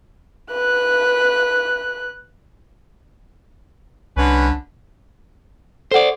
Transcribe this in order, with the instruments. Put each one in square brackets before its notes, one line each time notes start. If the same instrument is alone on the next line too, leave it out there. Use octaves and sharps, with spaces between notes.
[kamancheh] B4 F#6
[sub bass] C2 [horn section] D3 C#4 B4
[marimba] A4 F#5 [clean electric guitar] C5 D5